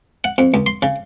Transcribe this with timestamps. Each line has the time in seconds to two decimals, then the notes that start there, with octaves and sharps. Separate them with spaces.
0.24 F#5
0.38 F2
0.54 C#2
0.66 C6
0.82 C#3